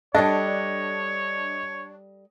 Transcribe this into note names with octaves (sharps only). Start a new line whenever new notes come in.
G3 D4 A4 C#5 D#5